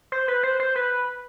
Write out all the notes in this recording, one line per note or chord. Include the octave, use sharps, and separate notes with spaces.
C5
B4
C5
C5
B4